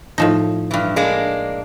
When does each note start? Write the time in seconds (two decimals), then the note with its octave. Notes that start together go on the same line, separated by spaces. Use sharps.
0.18 A2 F3 D#4
0.71 G2 E3
0.96 G#3 A#3 D4